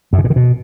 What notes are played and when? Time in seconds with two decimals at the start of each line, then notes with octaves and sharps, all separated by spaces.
0.13 F#2
0.19 C#3
0.24 A#2
0.30 D#3
0.36 B2